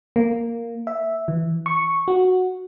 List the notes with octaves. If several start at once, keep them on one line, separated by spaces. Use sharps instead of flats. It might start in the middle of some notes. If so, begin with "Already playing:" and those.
A#3
E5
E3
C#6
F#4